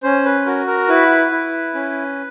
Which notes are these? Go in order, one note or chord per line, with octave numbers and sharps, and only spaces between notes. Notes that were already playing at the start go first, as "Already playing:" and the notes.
C#4 C5
B4
F#4 A#4
A#4
E4 B4
E4
C#4